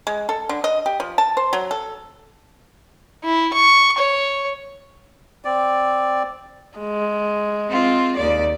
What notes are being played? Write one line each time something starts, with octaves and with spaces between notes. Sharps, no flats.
G#3
A4
D3
D#5
G4
F3
A5
C5
F#3
A4
E4
C#6
C#5
C4 D5
G#3
C4 F4
D#2 D5